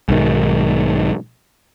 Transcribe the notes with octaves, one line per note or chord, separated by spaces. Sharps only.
B1 G#2 D#3